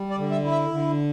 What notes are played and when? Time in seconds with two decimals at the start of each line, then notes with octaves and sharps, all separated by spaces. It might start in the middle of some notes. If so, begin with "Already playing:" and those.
Already playing: G3
0.10 D5
0.18 D3
0.31 E5
0.44 E4
0.51 E5
0.71 D3